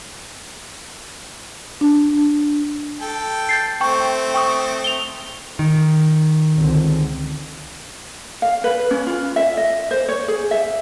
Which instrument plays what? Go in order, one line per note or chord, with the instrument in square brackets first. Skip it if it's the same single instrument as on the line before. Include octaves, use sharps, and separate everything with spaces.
[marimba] D4
[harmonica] A4 G5
[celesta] G6 A6 C7
[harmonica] A3 C4 [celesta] G5 C#6
[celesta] G5 C#6 D#6
F7 G7
[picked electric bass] D#3
[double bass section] C#2 D3 C4
[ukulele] F5
B4
C#4
F4
E5
D#5
C5
C#5
G#4
E5